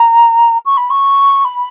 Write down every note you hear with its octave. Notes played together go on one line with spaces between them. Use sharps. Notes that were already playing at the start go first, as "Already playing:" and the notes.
Already playing: A#5
C#6
B5
C#6
B5